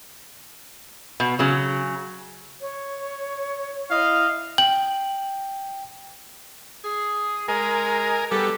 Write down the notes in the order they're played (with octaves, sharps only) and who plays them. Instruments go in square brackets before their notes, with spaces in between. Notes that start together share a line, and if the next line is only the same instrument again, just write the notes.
[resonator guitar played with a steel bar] B2
C#3 F#3
[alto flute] C#5
[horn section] E4 D#5 F5
[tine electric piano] G5 [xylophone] F#7
[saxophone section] G#4
[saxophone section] G#3 [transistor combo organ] A#4 G#5
[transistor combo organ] G3 [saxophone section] B3 G4 A4